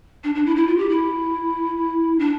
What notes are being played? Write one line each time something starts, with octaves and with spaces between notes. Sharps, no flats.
D4
D4
E4
E4
F4
G4
E4
D4